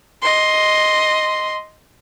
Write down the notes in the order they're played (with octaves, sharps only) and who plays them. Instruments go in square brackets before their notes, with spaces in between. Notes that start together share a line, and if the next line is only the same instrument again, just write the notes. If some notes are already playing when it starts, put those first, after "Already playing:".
[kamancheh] D#5 C6